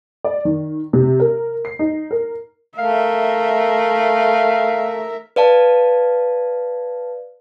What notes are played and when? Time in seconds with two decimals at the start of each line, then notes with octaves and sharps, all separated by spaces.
0.24 D5
0.45 D#3
0.93 C3
1.20 A#4
1.65 C7
1.79 D#4
2.11 A#4
2.78 A3 A#4 E5 F5
5.36 B4 D5 F5 A5